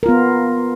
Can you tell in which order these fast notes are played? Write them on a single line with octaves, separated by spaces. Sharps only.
A#4 F4 B3